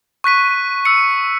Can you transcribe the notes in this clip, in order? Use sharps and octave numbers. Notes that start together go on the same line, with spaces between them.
C#6 F#6 B6 D#7
E6 C#7